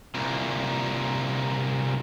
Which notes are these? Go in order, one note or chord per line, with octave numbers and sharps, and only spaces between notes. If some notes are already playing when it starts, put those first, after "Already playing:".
C2 A#2